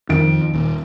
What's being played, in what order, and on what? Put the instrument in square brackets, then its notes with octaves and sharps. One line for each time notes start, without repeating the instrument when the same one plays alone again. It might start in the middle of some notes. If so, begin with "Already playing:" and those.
[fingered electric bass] F2 F3 [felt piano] D#3 D7
[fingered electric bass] D#1